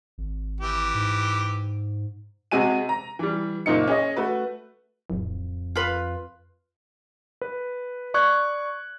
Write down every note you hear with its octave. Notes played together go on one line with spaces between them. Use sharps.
G#1
E3 G4
G#2
C3 G#3 F#4 G#5 D#7
A#5
E3 G3
F#1 A#2 D#4 C#7
C#4 G#4 D#5
A3 F#4 B4
D1 F2
F4 B4
B4
D5 C#6 F#6 G#6